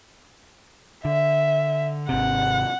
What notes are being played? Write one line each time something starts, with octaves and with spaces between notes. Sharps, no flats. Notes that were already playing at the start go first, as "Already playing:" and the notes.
D3 E5
G#1 C3 F#5